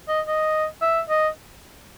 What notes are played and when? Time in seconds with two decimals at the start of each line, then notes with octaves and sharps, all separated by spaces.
0.08 D#5
0.27 D#5
0.82 E5
1.09 D#5